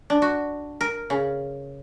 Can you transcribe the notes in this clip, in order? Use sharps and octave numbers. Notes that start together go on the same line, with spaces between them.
D4
F#4
A#4
C#3